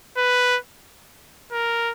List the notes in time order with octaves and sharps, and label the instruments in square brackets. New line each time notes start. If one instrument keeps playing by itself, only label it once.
[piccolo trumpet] B4
A#4